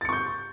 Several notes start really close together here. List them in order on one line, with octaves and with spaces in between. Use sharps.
A6 C#7 C#6 G6